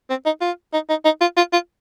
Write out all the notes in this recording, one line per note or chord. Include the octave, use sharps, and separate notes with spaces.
C4
D#4
F4
D#4
D#4
D#4
F4
F4
F4